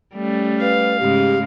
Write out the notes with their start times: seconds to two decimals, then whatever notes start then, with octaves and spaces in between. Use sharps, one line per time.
0.15 G3 A3 C#4
0.61 B4 F5
1.00 G#2 C#3 G#3 G4